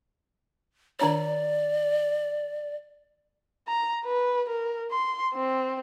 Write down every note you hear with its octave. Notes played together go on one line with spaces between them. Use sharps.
D#3 D4 C#5 D5
A#5
B4
A#4
C6
C4